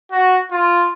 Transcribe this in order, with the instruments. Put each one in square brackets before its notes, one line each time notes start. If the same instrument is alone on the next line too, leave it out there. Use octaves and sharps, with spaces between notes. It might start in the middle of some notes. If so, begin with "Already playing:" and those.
[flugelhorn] F#4
F4